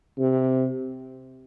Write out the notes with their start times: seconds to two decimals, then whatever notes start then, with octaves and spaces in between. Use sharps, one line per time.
0.18 C3